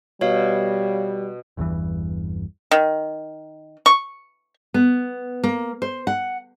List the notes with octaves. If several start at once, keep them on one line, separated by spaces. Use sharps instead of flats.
B2 G3 C#5 F5
G1 E2 G2 E3
D#3
C#6
B3
A#3
C5
F#5